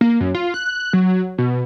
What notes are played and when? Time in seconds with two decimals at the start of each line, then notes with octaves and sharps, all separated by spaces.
0.01 A#3
0.20 F#2
0.35 F4
0.54 F#6
0.93 F#3
1.38 B2